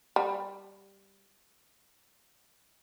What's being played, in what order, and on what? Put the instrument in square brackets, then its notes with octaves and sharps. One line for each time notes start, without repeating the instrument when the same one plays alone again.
[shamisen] G3